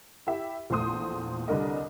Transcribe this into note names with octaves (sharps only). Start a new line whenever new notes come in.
E4 G4 E5
A#1 E2 A3 C5 C6 D#6
C2 D3 G3 D4 A#4 D#5